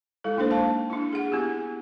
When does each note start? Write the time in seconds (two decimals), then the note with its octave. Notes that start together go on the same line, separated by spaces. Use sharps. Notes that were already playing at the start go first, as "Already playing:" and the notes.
0.24 G#3 E4 A4
0.37 A#3 D4 D#4 A4 C5
0.50 C5 F5 A5
0.90 D4 E4
1.13 G#4 F#5
1.32 B3 E4 G4